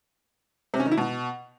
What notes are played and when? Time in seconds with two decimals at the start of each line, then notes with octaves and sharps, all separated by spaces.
0.74 C3
0.80 C#4
0.86 D#3
0.91 E4
0.97 B2